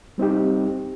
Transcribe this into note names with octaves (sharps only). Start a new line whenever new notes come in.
G3 C4 D#4 G4